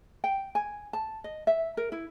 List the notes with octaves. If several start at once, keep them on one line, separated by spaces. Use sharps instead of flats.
G5
G#5
A5
D#5
E5
A#4
E4